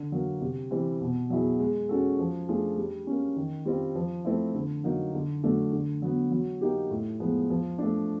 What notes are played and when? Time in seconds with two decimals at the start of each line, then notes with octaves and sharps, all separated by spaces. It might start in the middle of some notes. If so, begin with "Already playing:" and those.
Already playing: D3
0.12 F#3 A#3
0.41 C3
0.71 E3 G3 C4
1.01 B2
1.30 F#3 B3 E4 G#4
1.59 G#3
1.89 C#4 F#4 A4
2.19 F3
2.48 A3 D4 F4 G#4
2.77 G3
3.07 A#3 C#4
3.36 D#3
3.65 G3 C4 F4
3.95 F3
4.25 A3 C4 E4
4.55 D3
4.84 F#3 A#3 D#4
5.14 D3
5.43 F#3 A3 D4
5.73 D3
6.02 F#3 B3
6.32 F#3
6.61 A#3 D#4 G4
6.91 A2
7.20 F3 G#3 B3
7.50 F3
7.78 A3 D4